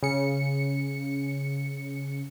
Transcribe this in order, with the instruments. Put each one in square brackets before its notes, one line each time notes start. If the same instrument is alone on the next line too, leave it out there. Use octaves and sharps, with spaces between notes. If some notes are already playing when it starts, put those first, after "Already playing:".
[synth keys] C#3 C#7